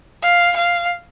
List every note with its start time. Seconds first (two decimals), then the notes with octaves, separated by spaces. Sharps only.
0.23 F5
0.57 F5